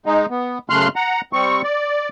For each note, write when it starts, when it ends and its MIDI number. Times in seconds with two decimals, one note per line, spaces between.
0.06 0.26 56
0.06 0.26 63
0.30 0.59 59
0.70 0.88 42
0.70 0.88 49
0.70 0.88 57
0.70 0.88 84
0.70 0.88 89
0.70 0.88 90
0.96 1.21 78
0.96 1.21 82
1.33 1.62 55
1.33 1.62 60
1.33 1.62 85
1.64 2.09 74